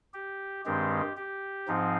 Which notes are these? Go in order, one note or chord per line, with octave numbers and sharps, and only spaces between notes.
G4
G2 D#3 G#3 C4 G4
G4
G#2 F3 C4 D#4